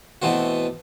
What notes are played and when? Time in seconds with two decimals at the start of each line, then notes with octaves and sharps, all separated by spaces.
0.22 B2 E3 A3 C4 F#4